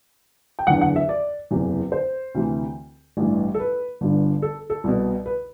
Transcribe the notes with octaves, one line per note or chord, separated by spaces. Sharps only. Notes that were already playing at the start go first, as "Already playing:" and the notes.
G5
F#1 E2 D3 F#5
F#5
E5
D5
F#1 E2 C3 E3
C5
D2 C3 E3
A1 G2 E3
A4
B4
G1 G2 D3
A4
A4
C2 B2
B4